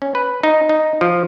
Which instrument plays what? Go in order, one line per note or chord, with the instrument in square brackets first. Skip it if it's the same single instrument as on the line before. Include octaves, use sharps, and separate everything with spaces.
[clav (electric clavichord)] C#4
B4
D#4
D#4
F3